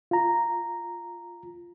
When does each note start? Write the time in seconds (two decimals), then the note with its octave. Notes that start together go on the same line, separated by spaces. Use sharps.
0.11 F4 A#5